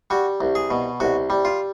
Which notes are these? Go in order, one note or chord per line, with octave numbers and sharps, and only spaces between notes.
G3 F#4
C2
G#4
B2
C2 F#4
G3
F4